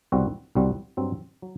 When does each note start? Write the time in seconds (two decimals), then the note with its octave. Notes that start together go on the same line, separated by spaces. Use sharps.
0.12 C2 B2 G3 C4 F#4
0.55 C2 B2 G3 C4 F#4
0.97 G2 F#3 C4
1.42 F#3